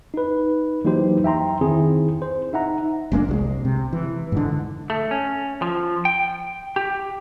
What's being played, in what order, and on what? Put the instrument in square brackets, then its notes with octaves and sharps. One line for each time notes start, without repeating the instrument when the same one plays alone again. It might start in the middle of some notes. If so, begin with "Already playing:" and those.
[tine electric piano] D#4 B4
E3 F#3 A#3 D#4 G4 C5
E5 G5 A#5 C6
D#3 C4 E4 G#4
C5
D#4 E5 F#5 A#5
[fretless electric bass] F#1 G#3 A#3 D4
C2 F#3 G#3
C3
E3
G#2 D3
[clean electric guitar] A3
C#4
F3
G5
G4